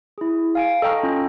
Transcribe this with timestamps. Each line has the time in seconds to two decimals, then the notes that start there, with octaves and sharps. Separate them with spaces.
0.18 E4 G#4
0.55 F5 G#5 D7
0.82 A4 D#5 G5 A#5 C#6 F6
1.03 C#4 F4